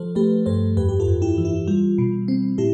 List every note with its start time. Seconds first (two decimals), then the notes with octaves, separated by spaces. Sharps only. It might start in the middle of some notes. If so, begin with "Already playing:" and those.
Already playing: F3 A4 C5
0.15 A3 G4 B4
0.46 G2 A4 C5
0.77 F2 G4 B4
0.89 G4
1.00 F4 A4
1.07 F2
1.22 E4 G4
1.38 E3
1.45 E4
1.67 G3 F4
1.98 B2
2.28 C4
2.58 A2 E4 G4